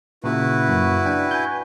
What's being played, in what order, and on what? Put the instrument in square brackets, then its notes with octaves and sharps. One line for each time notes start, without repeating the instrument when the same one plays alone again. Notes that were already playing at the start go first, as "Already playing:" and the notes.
[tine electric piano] A#2 C#3 [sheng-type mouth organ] E4 F#4 B4
[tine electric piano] F#2 A#3
D4 G5
G#5 G6